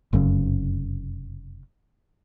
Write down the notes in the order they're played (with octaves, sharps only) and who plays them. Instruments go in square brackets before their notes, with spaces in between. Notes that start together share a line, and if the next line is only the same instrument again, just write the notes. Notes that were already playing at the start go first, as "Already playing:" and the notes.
[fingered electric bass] F1 F#2 C#3